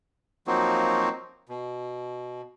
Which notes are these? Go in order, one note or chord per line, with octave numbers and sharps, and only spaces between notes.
F3 F#3 A#3 C4 D#4 F#4
B2